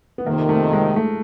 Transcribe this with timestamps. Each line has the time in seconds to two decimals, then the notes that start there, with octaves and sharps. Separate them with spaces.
0.18 B3
0.26 F2 C3 D#3 A#3
0.49 A3
0.73 G#3
0.96 A3